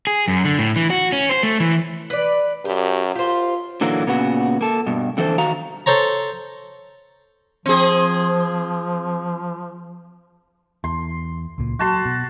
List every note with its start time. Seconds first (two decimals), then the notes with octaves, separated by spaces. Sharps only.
0.07 G#4
0.28 F#2
0.45 D3
0.59 A2
0.76 E3
0.90 F#4
1.12 C#4
1.29 C5
1.43 A3
1.60 E3
2.10 B4 D5
2.65 F#2 G4
3.15 F4 G4 C5
3.81 A#2 D3 E3 F#3 A#3
4.07 A#2 C#3 B3 F#4
4.61 A#3 A4
4.86 G2 B2
5.17 F2 D3 E3 A4 C5
5.38 D#3 F#4 F5 A#5
5.86 A4 C5 C#5 A#5
7.66 F3 C4 G#4
10.84 E2 C6
11.58 C#2 A#2
11.79 F#3 F#4 A5 C6
12.05 B2